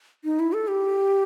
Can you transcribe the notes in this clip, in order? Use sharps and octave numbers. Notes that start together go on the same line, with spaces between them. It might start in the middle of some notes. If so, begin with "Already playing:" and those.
D#4
E4
A4
G4